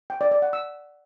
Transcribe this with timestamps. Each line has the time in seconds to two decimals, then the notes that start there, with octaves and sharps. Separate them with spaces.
0.10 G5
0.21 D5
0.31 D5
0.42 F#5
0.53 E6